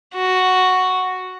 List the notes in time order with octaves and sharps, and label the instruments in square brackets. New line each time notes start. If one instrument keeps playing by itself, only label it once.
[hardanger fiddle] F#4